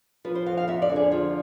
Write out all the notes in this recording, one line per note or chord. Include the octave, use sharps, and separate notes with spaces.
F3 B4
C5
F2 F5
F5
F2 E5
D5
D3
G#4
F3 F4